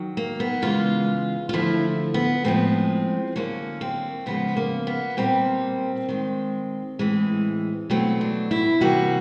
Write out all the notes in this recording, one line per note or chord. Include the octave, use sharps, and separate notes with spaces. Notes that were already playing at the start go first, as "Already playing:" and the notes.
Already playing: D#3 F#3
A#3
B3
C#3 E3 G#3 F4
F4
D3 F3 A3 E4
B3
A2 F3 G#3 C4
D3 F#3 A#3 C#4
C4
C#3 F3 G#3 B3
A#3
B3
A#2 G3 A#3 C4
D#3 G#3
A2 E3 G#3
B2 F#3 A3 C4
D4
E4
C3 E3 G3 A#3 F#4